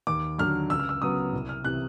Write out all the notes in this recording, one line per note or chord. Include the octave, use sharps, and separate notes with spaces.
D#2 D6
D3 F#3 F6
C#2 E6
F6
E6
C#3 F#3 B3 D#6
C2
F6
C3 E3 F#6